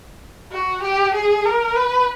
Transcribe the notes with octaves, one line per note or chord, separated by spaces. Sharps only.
F#4
G4
G#4
A#4
B4